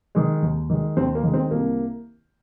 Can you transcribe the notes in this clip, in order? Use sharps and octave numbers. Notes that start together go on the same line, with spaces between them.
D#3 G#3
D#2
D#3 G#3
D#2 C4
A#3
D#3 G#3
C4
C2 A#3